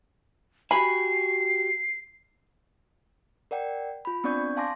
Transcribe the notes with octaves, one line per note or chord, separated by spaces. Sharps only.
F#4 G4 G#5 B5 C7
A#4 D5 F#5 G5
F4 B5
B3 C4 D4 D5 C#6 G6
F5 G#5 A5 C6 D6 A#6